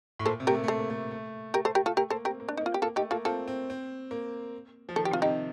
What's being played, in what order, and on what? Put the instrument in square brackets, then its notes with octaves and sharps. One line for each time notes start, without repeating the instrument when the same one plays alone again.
[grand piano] A2
[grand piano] A#2 [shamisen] A4 C5
[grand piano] C3
[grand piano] A3 [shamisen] G4 A#4
[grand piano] A#3
A3
[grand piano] A#3 [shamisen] A4 C5
[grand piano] A#3
A3
A3
[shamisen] G4 A#4
A4 C5
G4 A#4
F4 A4
[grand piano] A3 [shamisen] G4 A#4
[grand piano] A#3 [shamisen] A4 C5
[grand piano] C4 [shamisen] G4 A#4
[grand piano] A#3
[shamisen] D4
D#4
[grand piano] A#3
[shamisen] F4
G4
[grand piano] A#3 [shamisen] F4 A4
[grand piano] A3 [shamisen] D#4 G4
[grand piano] A#3 [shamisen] F4 A4
[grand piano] C4 [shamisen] F4 A4
[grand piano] C4
C4
A#3
F3
[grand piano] D#3 [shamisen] A4
[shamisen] G4
[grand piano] C3
[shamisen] F4
[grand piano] C3 [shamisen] D#4 G4